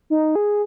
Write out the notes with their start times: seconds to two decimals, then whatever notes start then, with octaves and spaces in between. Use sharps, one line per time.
0.10 D#4
0.35 G#4